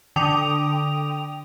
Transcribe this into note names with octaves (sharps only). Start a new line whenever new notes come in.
D3 G5 D#6 F7